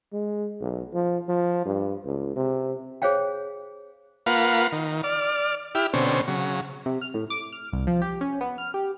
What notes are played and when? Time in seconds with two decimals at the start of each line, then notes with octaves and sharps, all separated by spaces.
0.13 G#3
0.61 B1
0.93 F3
1.28 F3
1.65 G2
2.05 C#2
2.36 C3
3.02 G#4 C5 C#5 F5 G5
4.26 A#3 F4 B4 F5 F#5
4.72 D#3
5.04 D5 F6
5.75 E4 G4 F6
5.93 B2 D3 C4 C#4
6.27 C#3 F#3
6.86 C3
7.01 F6
7.14 A2
7.30 D6
7.52 F6
7.73 C2
7.87 F3
8.02 G4
8.21 C#4
8.41 B3
8.58 F6
8.74 G4